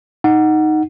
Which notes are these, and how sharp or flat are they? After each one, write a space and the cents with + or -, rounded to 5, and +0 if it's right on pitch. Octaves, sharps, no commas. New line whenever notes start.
D#4 +0 F#5 +0